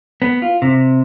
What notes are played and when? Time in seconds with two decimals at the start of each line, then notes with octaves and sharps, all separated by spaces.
0.22 B3
0.42 F4
0.62 C3